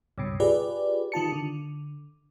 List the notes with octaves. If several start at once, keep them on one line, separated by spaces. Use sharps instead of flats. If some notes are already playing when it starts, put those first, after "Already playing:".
C#2 G2 B2
F4 G4 G#4 B4 D5
D#3 F4 A5 C#7
D3